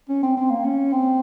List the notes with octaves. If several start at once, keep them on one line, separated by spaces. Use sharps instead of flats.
C#4
C4
C4
A#3
C#4
C4